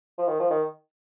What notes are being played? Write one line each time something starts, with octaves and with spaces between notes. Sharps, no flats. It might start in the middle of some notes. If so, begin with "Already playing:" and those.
F3
D#3
F3
D#3